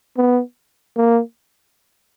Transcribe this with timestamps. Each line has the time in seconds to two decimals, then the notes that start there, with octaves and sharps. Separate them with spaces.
0.17 B3
0.97 A#3